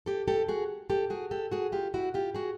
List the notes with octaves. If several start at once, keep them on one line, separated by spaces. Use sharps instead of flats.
G4 A4
G4 A4
F#4 G#4
G4 A4
F#4 G#4
G4 A4
F#4 G#4
F4 G4
E4 F#4
F4 G4
F#4 G#4